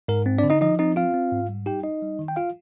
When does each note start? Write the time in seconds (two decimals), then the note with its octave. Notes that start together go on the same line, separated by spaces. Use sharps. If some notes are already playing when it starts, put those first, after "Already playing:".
0.08 G#2 A#4
0.26 C4
0.38 D4 D5
0.43 D3
0.50 D#4 D#5
0.61 F3 D#4 D#5
0.79 C4 D#4 D#5
0.96 C4 F4 F5
1.14 C4
1.32 G#2
1.49 G3
1.66 D#4 G4 G5
1.84 D#4 D#5
2.02 G3
2.19 D#3
2.28 G5
2.36 F4 F5